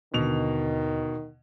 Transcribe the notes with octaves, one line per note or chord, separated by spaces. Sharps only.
D#2 B2 D3 D#3 F7